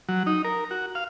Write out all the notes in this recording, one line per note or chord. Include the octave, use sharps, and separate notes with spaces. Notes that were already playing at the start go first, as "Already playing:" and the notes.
F#3
D#4
A#4
F#4
F5